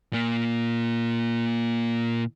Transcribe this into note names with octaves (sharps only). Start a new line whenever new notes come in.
A#2 A#3